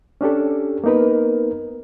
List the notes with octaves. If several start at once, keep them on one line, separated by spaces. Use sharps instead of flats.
C#4 D4 G4 A4
A#3 B3 D#4 A#4 B4